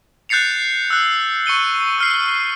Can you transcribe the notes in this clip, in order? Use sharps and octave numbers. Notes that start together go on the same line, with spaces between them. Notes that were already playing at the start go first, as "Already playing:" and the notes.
F#6 G6 A6 C7 C#7 F7
E6 F#6
C#6 C#7 D#7 G7
E6 F6 C7